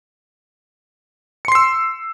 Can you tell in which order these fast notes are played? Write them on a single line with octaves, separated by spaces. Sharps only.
C#7 C6 C7 E6